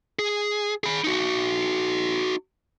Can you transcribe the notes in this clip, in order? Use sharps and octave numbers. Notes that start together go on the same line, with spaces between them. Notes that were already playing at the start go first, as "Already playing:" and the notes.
G#4
G#4 B5
D#4 F#4